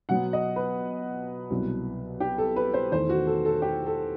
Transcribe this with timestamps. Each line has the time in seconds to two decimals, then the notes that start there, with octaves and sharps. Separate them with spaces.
0.09 B2 F#3 B3 F#5
0.33 D#5
0.56 B4
1.50 C2 B2 F#3
2.20 G4
2.38 A4
2.56 B4
2.74 C5
2.91 E2 D#3 A3 C5
3.09 F#4
3.27 A4
3.45 A4
3.62 G4
3.86 A4